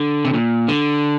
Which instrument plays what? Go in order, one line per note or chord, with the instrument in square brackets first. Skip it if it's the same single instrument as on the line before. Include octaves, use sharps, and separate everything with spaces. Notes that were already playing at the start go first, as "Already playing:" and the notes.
Already playing: [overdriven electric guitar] D3
C3
A#2
D3